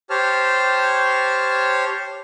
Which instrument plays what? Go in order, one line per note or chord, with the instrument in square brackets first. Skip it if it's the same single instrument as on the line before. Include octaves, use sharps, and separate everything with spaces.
[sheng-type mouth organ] G4 C5 C#5 A5 F6